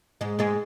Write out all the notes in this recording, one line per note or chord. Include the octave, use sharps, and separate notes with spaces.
G#2 G#3
G#2 G#3